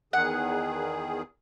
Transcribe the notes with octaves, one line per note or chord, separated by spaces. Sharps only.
E2 D#3 G#4 F#5